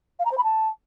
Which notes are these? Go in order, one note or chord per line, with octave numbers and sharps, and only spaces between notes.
F5
A#5
C5
B5
A5